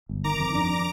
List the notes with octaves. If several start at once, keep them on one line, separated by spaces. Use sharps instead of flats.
G1
D#3 A#5 D6
F2
D4